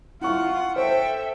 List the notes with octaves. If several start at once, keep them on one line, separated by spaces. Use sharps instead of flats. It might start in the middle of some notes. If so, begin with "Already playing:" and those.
E4 F4 F#5 C#6
A4 C5 E5 G5